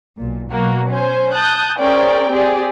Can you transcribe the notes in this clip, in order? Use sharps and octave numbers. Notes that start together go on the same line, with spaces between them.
B1 A#2
B2 F#3 A#3 F#4
C#4 C5 G#5
A5 D#6 F#6 G6
C#4 G#4 A#4 C5 D5 G5
C4 G4 G#4 D5